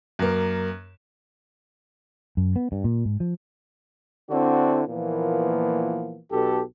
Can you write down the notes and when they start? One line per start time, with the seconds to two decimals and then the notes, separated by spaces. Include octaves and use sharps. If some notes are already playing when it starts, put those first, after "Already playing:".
0.19 F#2 A#3
2.37 F#2
2.56 B3
2.72 G2
2.84 A#2
3.05 G#2
3.20 F3
4.31 D3 C4 D4 E4 F#4
4.88 A#2 E3 F3 A#3 B3
6.32 B1 B2 G4 A4